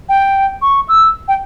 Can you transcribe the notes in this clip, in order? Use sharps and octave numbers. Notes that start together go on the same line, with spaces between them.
G5
C#6
E6
G5